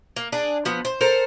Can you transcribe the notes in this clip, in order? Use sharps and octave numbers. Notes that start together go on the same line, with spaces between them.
A#3
D4 G#4
F3 B3
C5
A4 A#4 C5